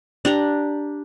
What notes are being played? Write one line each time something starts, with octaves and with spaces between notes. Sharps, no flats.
D4 G4 A#5